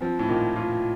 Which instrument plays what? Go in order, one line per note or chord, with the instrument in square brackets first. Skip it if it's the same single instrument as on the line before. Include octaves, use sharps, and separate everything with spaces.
[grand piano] F3 [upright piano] C4
[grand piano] A2
[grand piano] A#2 [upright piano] D#3
[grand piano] A#2 [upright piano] F4